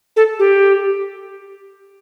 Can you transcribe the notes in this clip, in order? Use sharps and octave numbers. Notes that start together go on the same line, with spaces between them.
A4
G4